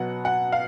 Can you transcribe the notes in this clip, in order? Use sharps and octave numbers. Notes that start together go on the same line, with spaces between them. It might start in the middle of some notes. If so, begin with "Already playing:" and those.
Already playing: B2 F#3 B3 F#5
F#5
F5